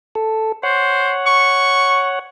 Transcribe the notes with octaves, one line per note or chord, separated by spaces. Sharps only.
A4
C5 C#5 F#5
C#6